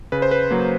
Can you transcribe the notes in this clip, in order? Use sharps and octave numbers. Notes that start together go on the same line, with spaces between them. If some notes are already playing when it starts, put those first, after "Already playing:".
C#3 B4
C5
B4
F#3 A#3